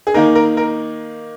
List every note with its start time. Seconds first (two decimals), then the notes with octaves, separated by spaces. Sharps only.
0.07 G#4
0.14 D#3 A#3 D#4 A#4
0.35 A#4
0.57 A#4